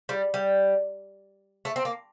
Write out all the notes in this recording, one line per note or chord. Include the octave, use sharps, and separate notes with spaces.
G3
G3
A3
C4
A#3